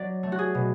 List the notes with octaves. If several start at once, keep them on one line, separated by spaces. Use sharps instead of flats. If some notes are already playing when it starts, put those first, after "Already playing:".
Already playing: F#3 D5
A3
F#4
G#4
B2